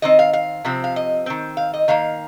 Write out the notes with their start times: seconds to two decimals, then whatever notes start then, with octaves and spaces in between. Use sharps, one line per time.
0.02 D#3 C4 D#5
0.19 F5
0.33 F5
0.65 C3 F3 C4
0.84 F5
0.96 D#5
1.26 D#3 C4
1.57 F5
1.74 D#5
1.88 D#3 A#3 F5